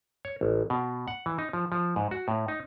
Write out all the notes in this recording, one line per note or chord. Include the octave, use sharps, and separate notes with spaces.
C#5
A1
B2
F#5
E3
D#4
F3
F3
G#2
F#4
A2
D#4